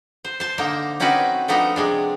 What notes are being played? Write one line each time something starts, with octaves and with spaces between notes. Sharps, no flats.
C5
C5 A5
D3 A#3 D#4
C4 C#4 D#4 F#4 B4 D5
F3 A3 B3 D4 D#4
C3 G#3 D4